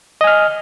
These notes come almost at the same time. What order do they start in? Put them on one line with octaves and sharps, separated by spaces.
D#5 G#5 F6